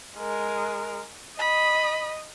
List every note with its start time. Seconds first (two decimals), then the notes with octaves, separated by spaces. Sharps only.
0.18 G#3 A#4
1.39 D#5 B5